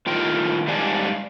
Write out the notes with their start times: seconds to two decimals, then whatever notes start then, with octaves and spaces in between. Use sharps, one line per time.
0.06 A2 D#3 F4 G5
0.67 G#2 G3 D4 D5 F5 G#5